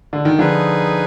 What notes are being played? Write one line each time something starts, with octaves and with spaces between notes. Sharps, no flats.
D3
D#3
D3 F3 D#4 G#4 B4